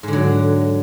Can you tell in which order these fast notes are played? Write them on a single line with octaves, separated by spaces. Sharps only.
G#2 D3 F#3